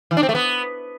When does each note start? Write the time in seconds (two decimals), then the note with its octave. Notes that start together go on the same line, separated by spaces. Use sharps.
0.11 E3
0.17 D4
0.23 C4
0.29 A3
0.35 B3